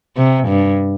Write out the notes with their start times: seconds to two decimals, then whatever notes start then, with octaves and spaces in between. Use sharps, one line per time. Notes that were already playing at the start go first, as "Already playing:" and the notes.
0.17 C3
0.48 G2